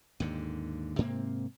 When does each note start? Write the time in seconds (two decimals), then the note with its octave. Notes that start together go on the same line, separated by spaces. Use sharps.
0.20 D#2 G#2 D3
0.98 G#2 C3 A#3 C4